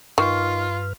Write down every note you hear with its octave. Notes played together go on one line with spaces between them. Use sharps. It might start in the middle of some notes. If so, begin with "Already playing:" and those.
G2 D#3 F4 B4 C#6 F6